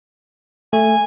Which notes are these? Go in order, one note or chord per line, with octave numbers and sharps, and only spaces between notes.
A3 G#5